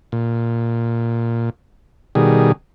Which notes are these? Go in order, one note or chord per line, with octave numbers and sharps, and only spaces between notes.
A#2
B2 D#3 G3 G#4